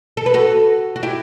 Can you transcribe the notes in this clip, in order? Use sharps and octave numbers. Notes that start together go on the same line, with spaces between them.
A4
B4
F#4 A4
F#4
E4 G4